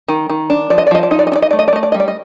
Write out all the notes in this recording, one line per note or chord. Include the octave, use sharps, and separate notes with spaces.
D#3
D#3
D4
F3 D5
D#5
D5
F3 D#5
D5
D#4 D#5
D5
D#5
D4
D5
D#5
A3 D5
D#5
D5
A3 D#5
D5
G3 D#5
D5
D#5